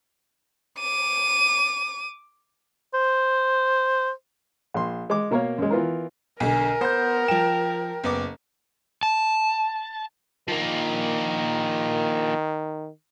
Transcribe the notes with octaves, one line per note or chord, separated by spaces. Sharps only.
D6 D#7
C5
A#1 C6
G#3 D6
B2 A#3 A#4 C#5 F5
F#2 G#3
E3 B3 F4 A#4
B1 D3 A#4 G#5
B3 C5 G6
F3 G5 E7
F#1 B3 D6
A5
D#3 F3 A#3